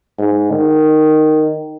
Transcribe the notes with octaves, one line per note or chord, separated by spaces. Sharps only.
G#2
D#3